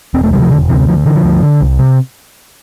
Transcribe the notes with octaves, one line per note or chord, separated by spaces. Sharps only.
E1 C4
A3
D2 C3 G3
F3
E1 D3
D2 C3 E3
D2 F3
D3 E3
F3
D2
D3
C2
C3